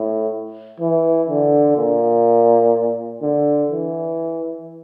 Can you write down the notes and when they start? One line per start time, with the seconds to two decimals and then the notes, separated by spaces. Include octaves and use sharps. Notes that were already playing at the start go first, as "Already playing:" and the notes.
Already playing: A2
0.80 E3
1.29 D3
1.77 A#2
3.22 D3
3.71 E3